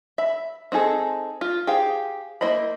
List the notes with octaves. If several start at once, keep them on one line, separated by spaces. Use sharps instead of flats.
E5 B5
C4 D#4 G#4 A4
F4
G4 G#4 C5 F5
A#3 E4 C5 D#5 B5